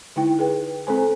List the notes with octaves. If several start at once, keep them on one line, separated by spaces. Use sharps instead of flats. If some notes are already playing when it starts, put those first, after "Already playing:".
D3 D#4 E4 G5
G#4 B4 G5
C4 A4 C5 G#5